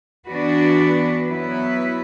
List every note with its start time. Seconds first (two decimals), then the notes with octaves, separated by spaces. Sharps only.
0.28 E3 B3 D4 F#4 B4
1.28 F#3 B3 E4 B4